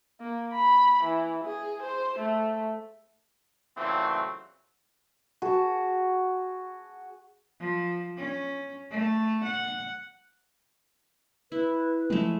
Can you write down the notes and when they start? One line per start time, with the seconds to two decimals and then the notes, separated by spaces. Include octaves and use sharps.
0.21 A#3
0.54 B5
1.04 E3
1.45 G#4
1.83 C5
2.19 A3
3.77 A#2 C#3 E3 F#3 A3 C4
5.42 F#4 G#4 A5
7.60 F3
8.17 C#4
8.91 A3
9.44 F#5
11.52 E4 B4
12.10 F3 G#3 A3